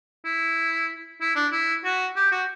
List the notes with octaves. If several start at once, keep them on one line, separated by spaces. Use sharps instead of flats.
E4
E4
D4
E4
F#4
G4
F#4